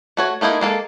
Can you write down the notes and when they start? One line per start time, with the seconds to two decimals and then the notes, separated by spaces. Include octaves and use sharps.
0.17 A3 F#4 C#5
0.41 A3 A#3 D#4 E4 G#4
0.61 G#3 A#3 A4